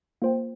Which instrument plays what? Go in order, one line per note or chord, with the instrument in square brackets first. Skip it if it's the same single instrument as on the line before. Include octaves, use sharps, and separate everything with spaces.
[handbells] A#3 F4 C5 G5